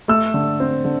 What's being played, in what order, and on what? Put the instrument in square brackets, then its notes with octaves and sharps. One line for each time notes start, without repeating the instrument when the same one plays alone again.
[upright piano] A3 E6
D3
C4
D3